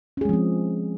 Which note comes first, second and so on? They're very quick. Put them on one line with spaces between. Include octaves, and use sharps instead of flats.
C#4 G#4 G#3 F3 C4